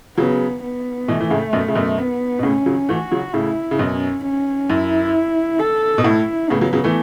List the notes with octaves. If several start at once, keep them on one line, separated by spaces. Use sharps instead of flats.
C#3 F#3 B3
B3
B2 E3 A3
E3
A2 C#3
F#2 B2
C#3
F#2 B2
B3
B2
A2 C#3 C#4
C#3 F#3
E3 A3 F#4
C#3 F#3
A2 C#3 E4
C#3
F#2 B2 C#4
C#4
F#2 E4
A4
B2
A2 E4
A2 C#3 B3
C#3 F#3
C#3 F#3
E3 A3